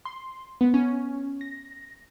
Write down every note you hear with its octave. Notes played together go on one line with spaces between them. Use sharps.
C6
B3
C#4
A#6